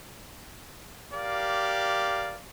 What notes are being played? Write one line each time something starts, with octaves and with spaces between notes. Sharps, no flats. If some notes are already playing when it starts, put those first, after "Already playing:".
G4 A#4 D5 F5